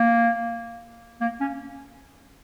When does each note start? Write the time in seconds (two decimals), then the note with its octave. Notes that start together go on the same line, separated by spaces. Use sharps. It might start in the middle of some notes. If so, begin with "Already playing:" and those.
Already playing: A#3
1.21 A#3
1.40 C#4